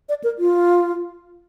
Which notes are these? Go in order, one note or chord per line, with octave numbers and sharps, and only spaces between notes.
D5
A#4
F4